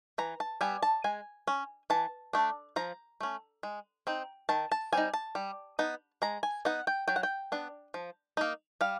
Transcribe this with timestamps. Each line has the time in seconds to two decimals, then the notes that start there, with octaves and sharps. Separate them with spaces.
0.18 E3 A#5
0.40 A5
0.61 G3 B3 G#5
0.82 A5
1.04 G#3 G#5
1.47 C#4
1.90 E3 A5
2.33 A3 D4
2.76 F3 A#5
3.21 A3 C#4
3.63 G#3
4.07 C4 D#4
4.49 D#3 A5
4.72 A5
4.93 G3 C4 D#4 G#5
5.14 A5
5.35 G3
5.79 B3 D#4
6.22 G#3 A#5
6.43 G#5
6.65 B3 D#4 F#5
6.87 G5
7.08 F#3 G5
7.16 F#5
7.23 G5
7.52 B3 D4
7.94 F3
8.37 A#3 D#4
8.81 G3 F5